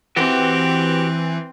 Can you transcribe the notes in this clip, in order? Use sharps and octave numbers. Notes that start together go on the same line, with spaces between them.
E3 C4 F#4 G4